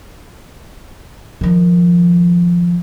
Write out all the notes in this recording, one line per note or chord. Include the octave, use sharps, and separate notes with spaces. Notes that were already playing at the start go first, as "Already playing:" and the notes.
D#3 F3